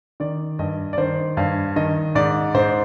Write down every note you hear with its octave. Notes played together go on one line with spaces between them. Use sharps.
D#3 D5
G2 D#5
D5
D#3 C5
G2 F5
D#3 D#5
G#2 D5
G#2 C5